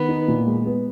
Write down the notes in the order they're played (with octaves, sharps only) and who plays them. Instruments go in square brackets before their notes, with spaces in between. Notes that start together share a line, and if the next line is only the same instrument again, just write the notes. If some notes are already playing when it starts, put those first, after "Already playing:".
Already playing: [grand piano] D#3 [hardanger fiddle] B3
[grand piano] D#4
A#2
G#3
B3